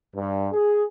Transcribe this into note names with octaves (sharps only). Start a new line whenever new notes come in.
G2
G#4